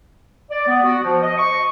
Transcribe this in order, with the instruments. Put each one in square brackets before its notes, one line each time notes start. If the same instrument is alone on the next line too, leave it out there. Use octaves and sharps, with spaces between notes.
[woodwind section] D5
B3
F#4
F3
D#5
C#6